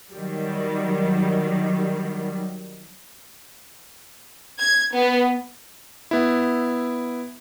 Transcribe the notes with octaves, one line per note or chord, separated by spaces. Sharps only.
D#3 F#3 G3
G#6
B3
B3 E4